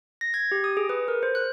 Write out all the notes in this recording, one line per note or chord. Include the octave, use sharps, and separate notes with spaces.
A#6
G#6
G4
D#6
G#4
B4
A#4
C5
F#6